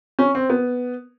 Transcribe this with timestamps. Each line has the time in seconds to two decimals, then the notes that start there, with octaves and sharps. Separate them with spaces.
0.19 C#4
0.35 C4
0.49 B3